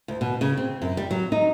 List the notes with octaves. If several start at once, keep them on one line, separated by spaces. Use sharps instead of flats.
D2
B2
C#3
C4
F#2
G3
F#3
D#4